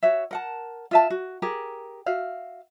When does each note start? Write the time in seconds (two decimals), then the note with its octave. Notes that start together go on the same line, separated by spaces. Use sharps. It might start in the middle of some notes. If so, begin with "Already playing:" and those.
0.03 F#4 C#5 E5
0.31 A#4 F#5 A5
0.91 F4 E5 A5
1.10 F#4
1.42 G4 G#4 A#4
2.06 F#4 E5 F5